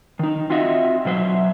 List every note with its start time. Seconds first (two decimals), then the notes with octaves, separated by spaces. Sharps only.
0.19 D#3 D#4
0.50 C4 F4 F#4 D#5 E5
1.05 B2 F#3 C5 E5